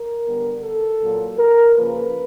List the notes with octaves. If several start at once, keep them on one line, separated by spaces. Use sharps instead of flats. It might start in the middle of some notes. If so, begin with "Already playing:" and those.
Already playing: A#4
D3 G3 B3
A4
A#2 F#3 A#3
A#4
C#3 F3 A#3 B4